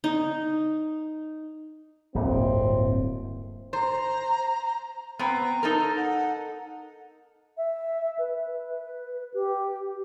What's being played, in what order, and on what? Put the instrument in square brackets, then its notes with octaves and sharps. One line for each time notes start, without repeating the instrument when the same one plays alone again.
[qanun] D#4
[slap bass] D1 G1 [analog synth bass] A#3 [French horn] C4
[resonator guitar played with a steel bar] C5 [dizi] A#5
[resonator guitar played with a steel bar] B3 C4 [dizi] A#5
[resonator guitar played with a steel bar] D#4 A4 A#4
[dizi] F#5
[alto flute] E5
B4
G4